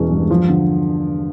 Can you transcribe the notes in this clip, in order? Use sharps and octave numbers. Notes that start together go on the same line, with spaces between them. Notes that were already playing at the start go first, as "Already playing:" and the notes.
Already playing: E1 E3 G#3 C#4
G2
F3
D3